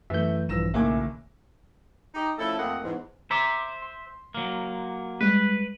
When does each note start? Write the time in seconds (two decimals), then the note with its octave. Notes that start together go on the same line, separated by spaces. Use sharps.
0.10 F#2 E3 A3 E5 G6
0.49 A#1 G2 E3 F3 E6 A#6 E7
0.74 F#1 B1 A2 D#3 A#3 E5 G#5 D6
2.15 D#4 G4 D#5
2.39 F3 A3 C#4 E4 A4
2.58 F2 A3 A#3 C4 D#5 F#5
2.83 E2 G#2
3.31 C5 E5 A#5 C6 D6
3.82 C6
4.35 F#3 A#3
5.21 G3 G#3 B4